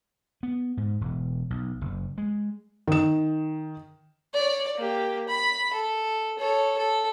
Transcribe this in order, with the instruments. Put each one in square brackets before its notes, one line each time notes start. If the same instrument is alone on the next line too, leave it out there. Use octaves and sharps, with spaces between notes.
[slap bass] B3
G#2
E1
B1
F#1
G#3
[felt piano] D#3 E7
[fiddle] C#5 D5
A#3 G4
B5
A4
A4 C#5
A4